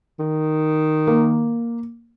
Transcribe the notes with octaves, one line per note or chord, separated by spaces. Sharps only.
D#3
A#3